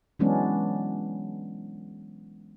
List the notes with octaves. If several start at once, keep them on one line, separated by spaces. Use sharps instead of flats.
E3 F#3 G#3 B3 C#4 D4